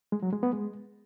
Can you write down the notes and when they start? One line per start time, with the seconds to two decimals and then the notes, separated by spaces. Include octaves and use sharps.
0.12 G#3
0.22 F#3
0.33 G#3
0.43 B3
0.53 G#3